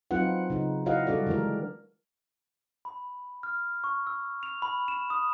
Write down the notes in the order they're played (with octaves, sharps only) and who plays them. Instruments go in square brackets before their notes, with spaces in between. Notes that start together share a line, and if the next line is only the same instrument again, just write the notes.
[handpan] F#3 C4 D#4 F4 B4 F#5
C#3 D#4
E4 F#4 C#5 D#5 F5 F#5
G3 D4 F#4 A4 D5
D3 E3 G#3 F#4 A#4
[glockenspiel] B5
F6
C#6
E6
F7
B5
E7
D#6